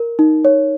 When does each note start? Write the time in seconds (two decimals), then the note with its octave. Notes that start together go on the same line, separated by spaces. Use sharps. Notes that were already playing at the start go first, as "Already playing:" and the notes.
Already playing: A#4
0.19 D#4
0.45 C#5